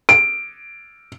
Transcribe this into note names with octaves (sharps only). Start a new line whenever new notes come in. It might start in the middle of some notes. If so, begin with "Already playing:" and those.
D7